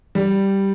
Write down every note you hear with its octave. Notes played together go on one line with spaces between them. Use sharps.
G3